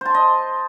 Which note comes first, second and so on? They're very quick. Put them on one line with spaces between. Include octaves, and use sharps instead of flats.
C5 A5 C6 D#5